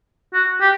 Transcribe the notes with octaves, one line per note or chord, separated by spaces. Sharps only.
F#4
G4